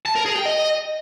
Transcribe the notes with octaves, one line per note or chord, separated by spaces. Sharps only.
A5
A#4
G#4
G5
D#5